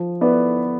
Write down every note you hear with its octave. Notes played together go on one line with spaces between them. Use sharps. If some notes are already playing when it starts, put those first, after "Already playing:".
Already playing: F3
B3 E4 B4 D5